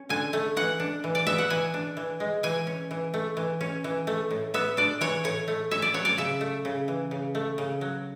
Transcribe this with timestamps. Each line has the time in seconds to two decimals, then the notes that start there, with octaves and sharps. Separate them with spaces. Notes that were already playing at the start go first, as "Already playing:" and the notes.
Already playing: C#4
0.09 D3 G#5
0.33 A3
0.56 E3 F#5
0.80 D4
1.04 E3
1.15 D5
1.27 B3 E5
1.38 F#5
1.50 E3 G#5
1.74 D4
1.97 E3
2.20 G#3
2.43 E3 G#5
2.67 C#4
2.91 E3
3.14 A3
3.37 E3
3.61 C#4
3.84 E3
4.07 A3
4.31 A2
4.54 B3 E5
4.77 D4 D5
5.01 E3 C#5
5.24 A2 C#5
5.48 A3
5.71 C#4 E5
5.82 D5
5.94 F#3 C#5
6.05 D5
6.18 C#3 E5
6.41 A3
6.65 C#3
6.88 E3
7.11 C#3
7.35 A3
7.58 C#3
7.81 F#3